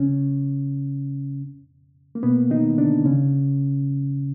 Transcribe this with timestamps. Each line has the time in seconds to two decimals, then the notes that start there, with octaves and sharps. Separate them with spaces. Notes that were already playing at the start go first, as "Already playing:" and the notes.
Already playing: C#3 C#4
2.15 A#3
2.23 B2 B3
2.50 D#3 D#4
2.77 D3 D4
3.05 C#3 C#4